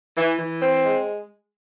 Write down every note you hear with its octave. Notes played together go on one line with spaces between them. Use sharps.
E3
E3
C4
G#3